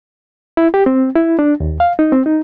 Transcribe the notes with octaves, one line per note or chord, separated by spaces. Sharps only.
E4
G4
C4
E4
D4
D#2
F5
D#4
C4
D#4